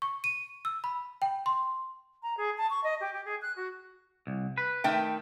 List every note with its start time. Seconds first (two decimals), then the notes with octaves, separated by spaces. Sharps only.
0.02 C#6
0.24 D#7
0.65 E6
0.84 B5
1.22 G5
1.46 C6
2.22 A#5
2.37 G#4
2.57 A5
2.70 C#6
2.83 D#5
3.00 G4
3.13 G4
3.25 G#4
3.41 F#6
3.56 F#4
4.27 C2
4.58 B4
4.84 D#3 A3 G5